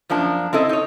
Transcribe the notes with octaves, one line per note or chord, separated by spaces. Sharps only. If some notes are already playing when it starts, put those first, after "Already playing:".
F#2 F3 A#3 D4 A5
C4 E4 A4 D#5
D#4 C#5